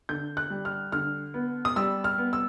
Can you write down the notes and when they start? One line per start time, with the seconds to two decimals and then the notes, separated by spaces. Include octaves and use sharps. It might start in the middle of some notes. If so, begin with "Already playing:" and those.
0.09 D3 G6
0.37 F#6
0.50 G3
0.65 F6
0.92 D3 F6
1.34 B3
1.65 D#6
1.76 G3 E6
2.04 F6
2.18 B3
2.33 E6